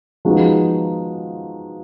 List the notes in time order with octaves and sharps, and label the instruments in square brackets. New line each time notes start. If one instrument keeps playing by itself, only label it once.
[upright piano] F3 G#3 B3 D#4 F#4